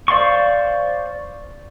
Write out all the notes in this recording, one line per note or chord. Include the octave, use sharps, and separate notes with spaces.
C5 D5 F5 C6 C#6